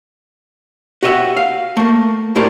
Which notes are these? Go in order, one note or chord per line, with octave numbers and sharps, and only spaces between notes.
F#4 G4 B4 D#5 E5 F#5
F5
A3 A#3
A2 A3 G4 A#4 C5 D5